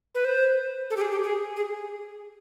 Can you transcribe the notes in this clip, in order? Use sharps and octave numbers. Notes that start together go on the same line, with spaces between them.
B4
C5
A4
G4
G#4
G4
G#4
G#4